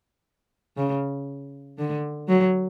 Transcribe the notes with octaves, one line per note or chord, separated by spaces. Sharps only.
C#3
D3
F#3